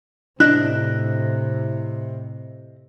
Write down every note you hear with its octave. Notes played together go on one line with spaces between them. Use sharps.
A2 C3 D4 E4 D#5 F#6